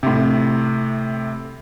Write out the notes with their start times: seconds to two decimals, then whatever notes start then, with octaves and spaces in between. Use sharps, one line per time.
0.03 A2 C3